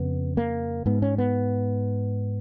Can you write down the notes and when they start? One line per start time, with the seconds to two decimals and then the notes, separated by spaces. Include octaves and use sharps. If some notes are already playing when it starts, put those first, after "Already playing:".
Already playing: F2 C#3 B3
0.37 A#3
0.86 G#2 B3
1.02 C#4
1.18 B3